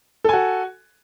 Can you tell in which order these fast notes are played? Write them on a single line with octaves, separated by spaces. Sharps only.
A4 G#5 F#4